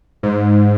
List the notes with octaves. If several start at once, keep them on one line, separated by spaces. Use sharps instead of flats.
G#2